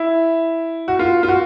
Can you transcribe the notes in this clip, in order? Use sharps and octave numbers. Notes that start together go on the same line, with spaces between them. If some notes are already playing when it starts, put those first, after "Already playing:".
Already playing: E4
F#4
F4
F4
F#4